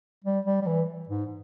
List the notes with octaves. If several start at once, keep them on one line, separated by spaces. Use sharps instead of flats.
G3
G3
G3
E3
G#2